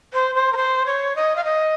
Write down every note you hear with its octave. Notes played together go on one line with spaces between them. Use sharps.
C5
C5
A#4
C5
C#5
D#5
F5
D#5